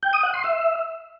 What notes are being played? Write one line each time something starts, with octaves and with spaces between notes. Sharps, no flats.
G5
D#6
F#5
C6
E5